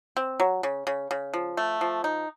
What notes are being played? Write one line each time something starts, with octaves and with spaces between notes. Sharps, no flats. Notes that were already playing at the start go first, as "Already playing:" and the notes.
C4
F#3
C#3
C#3
C#3
F3
A3
F3
D#4